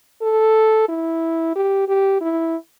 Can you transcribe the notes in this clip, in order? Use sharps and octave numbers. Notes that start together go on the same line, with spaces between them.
A4
E4
G4
G4
E4